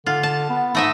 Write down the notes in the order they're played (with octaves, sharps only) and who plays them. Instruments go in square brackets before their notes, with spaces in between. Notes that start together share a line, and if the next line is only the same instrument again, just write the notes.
[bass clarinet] D3 [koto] F4
[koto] A5
[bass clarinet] B3
[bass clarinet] G#2 [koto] A3 D#5 E5